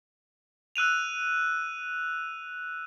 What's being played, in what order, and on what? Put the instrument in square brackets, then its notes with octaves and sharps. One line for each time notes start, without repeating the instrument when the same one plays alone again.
[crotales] E6 F#6 D#7 F7